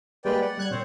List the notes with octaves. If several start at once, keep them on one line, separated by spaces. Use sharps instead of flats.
G3 G#3 A#3 B4 D5 G5
D5 F#5
G3 F#6 G#6
A#2 C4 C5 C#5